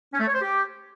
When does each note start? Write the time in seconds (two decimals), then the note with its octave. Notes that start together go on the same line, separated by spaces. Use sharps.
0.13 C#4
0.20 A3
0.27 C#5
0.35 C5
0.42 G4